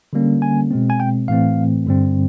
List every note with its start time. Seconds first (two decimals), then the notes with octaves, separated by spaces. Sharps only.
0.13 D3 G3 A#3 C#4
0.42 G#5
0.71 B2 G#3 C4
0.90 G#5
1.00 G5
1.28 A2 E3 A3 C4 F5
1.86 G2 D3 G3 C4